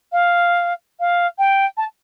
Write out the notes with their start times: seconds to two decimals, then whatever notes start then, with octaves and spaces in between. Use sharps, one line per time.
0.12 F5
1.00 F5
1.39 G5
1.77 A5